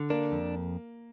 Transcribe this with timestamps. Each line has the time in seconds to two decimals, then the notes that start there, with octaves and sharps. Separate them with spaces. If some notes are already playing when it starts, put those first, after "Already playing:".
Already playing: D3
0.10 A#3 D4
0.32 F2